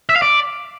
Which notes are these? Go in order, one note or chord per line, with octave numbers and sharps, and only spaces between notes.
E5
F5
D5